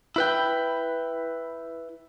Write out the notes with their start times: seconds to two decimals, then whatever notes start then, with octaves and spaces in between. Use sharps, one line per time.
0.16 E4 B4 G5